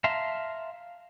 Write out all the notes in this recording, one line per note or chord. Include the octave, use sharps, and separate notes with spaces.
E5 F5 A5 A#5 C6